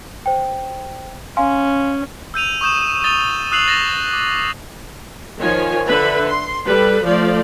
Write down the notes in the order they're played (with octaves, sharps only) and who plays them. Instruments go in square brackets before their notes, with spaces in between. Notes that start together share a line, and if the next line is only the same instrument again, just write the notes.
[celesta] C5 G5
[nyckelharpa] C#4 [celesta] F5 G#5 C6
[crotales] E6 G6 D#7 F7
C#6 D#6 G6 E7
D#6 A6 D#7 F7 G7
D#6 E6 F#6 C7 F7 F#7
A6 A#6 E7 F7
D6
[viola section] D#3 F3 C#5 G#5
D3 B4 E5 B5
C6
G3 A4 B4
F3 A3 D5